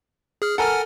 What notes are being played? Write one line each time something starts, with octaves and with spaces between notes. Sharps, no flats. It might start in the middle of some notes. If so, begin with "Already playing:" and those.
G#4 F6
A4 A#4 F#5 G#5 F6